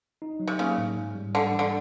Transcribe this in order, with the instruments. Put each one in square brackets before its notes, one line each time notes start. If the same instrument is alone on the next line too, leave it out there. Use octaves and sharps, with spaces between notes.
[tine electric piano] D#4
F#3
[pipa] C3
[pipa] C#3 [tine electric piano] A#3
[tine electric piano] A2
G#2
G3
[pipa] D3 [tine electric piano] G3
[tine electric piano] E3
[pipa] D3